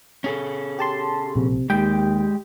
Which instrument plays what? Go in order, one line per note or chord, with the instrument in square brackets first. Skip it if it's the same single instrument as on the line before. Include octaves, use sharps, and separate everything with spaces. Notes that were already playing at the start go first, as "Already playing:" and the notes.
[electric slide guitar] C#4 G#4 A4
[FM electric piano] G4 A5 C6
[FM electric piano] A#1 [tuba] C3
[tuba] D#2 [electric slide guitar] G#3 G4 [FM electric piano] G5